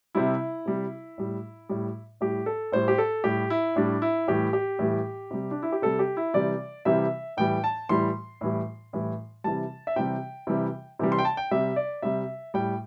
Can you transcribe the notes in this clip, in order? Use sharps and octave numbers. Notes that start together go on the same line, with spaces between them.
C3 G3 E4
C3 G3
A2 G3
A2 G3
A2 G3 G4
A4
A2 G3 C5
G4
A4
A2 G3 G4
E4
A2 G3 D4
E4
A2 E3 G3 G4
G4
A2 E3 G3
C3 G3
D4
E4
G4
C3 G3 A4
G4
E4
C3 E3 G3 D5
C3 E3 G3 E5
A2 E3 G3 G5
A5
A2 E3 G3 C6
A2 E3 G3
A2 E3 G3
C3 E3 G3 A5
E5
C3 E3 G3 G5
C3 E3 G3
C3 E3 G3
C6
G5
A5
G5
C3 G3 E5
D5
C3 G3 E5
A2 G3 G5